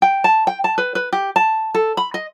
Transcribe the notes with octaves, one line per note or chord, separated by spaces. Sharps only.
G5
A5
G5
A5
B4
B4
G4
A5
A4
B5
D#5